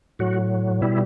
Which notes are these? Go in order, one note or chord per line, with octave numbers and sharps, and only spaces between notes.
A2 F#3 F#4
B2 G3 E4